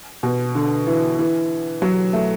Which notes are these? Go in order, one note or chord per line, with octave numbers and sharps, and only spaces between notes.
B2
D3
E3
E3
F#3
A3